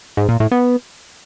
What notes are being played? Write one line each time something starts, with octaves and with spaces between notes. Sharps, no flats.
G#2
A#2
A2
B3